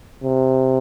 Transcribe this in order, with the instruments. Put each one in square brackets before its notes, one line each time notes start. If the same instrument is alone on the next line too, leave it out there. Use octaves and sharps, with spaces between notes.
[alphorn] C3